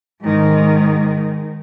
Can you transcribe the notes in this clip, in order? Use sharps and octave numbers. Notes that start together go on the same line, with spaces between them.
G#2 D#3